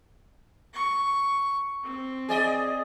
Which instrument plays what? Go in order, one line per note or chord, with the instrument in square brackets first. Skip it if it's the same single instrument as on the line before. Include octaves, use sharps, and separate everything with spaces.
[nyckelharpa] C#6
C4
[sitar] G#4 D5 D#5